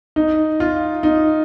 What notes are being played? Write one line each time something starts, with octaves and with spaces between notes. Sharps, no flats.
D#4
F4
D#4